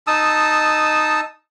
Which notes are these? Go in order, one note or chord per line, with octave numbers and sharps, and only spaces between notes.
D#4 A5 D#6 E6